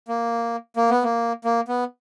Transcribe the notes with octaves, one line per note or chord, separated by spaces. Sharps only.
A#3
A#3
B3
A#3
A#3
B3